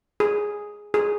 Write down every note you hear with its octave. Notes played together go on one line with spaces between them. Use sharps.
G#4
G#4